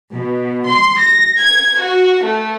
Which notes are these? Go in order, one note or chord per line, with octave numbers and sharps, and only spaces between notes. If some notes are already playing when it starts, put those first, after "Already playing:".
B2
C6
A#6
G#6
F#4
A3